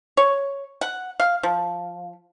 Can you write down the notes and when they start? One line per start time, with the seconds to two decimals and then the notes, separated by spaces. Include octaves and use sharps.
0.17 C#5
0.81 F#5
1.20 F5
1.43 F3